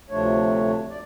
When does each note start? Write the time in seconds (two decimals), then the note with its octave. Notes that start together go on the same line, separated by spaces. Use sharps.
0.10 D2 C3 F3 A3 D4 C#5
0.90 D5